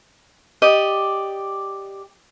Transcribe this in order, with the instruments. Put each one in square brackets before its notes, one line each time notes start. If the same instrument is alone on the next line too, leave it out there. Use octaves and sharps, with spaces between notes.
[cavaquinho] G4 D5 D#5